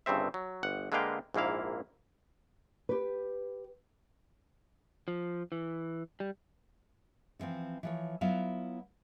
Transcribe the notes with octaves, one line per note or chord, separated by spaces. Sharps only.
G1 G2 C#3 C4 E5
F#3
G1 F#5
D3 G#3 A#3 B4 F5 G5
A#1 G#2 A#3 E4 F5
G4 B4
F3
E3
G3
D3 E3 F3 C4
E3 F3 C#5
F#3 B3 E4 F4 E5 F5